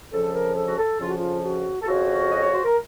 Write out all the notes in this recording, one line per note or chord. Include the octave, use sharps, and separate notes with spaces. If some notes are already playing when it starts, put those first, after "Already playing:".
F2 C#3 F3 A4
A#4
A4
F#4
A4
F2 C#3 F3 F4
F#4
F4
F#4
A4
F2 C#3 F3 F#4
D#5
C#5
C5
A#4